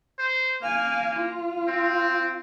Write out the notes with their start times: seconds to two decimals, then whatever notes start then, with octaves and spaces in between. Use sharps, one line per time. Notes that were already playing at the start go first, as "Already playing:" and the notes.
0.19 C5
0.62 A#3 F5 G#5
1.15 F4
1.68 C4